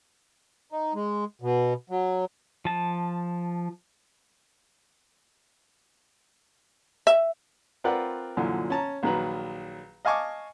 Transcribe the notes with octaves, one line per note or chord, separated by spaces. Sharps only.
D#4
G#3
B2
F#3
F3 A5
E5
C4 F4 A#4 B4 D5 F#5
F#2 A#2 D3 E3 F3
C#4 A5 A#5
A#1 D#3 F#3 B4 A#5
D#5 F5 G#5 A5 C#6 D6